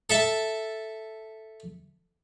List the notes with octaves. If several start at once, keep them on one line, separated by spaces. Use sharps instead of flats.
A4 E5 A5